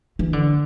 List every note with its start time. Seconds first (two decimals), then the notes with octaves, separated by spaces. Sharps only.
0.19 E3
0.33 D3